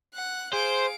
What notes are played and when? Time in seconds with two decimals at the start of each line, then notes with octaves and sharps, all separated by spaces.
0.14 F#5 F#6
0.53 G#4 C5 F5 D7